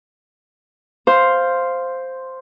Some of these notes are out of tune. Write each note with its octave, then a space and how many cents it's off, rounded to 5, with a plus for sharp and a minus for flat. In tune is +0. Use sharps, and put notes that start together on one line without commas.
C5 +0 F5 +0 C6 +0